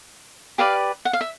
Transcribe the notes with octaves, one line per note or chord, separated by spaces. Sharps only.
G4 B4 D5 F5
F#5
F5
E5